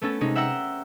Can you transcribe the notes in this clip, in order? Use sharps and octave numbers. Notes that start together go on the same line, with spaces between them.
A3 B3 C#4 A4
C3 G#3 C#4 D#4
E5 F#5 G5 A#5 E6 C#7